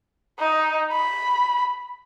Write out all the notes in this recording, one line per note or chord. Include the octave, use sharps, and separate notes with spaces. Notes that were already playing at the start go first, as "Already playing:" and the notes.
D#4
B5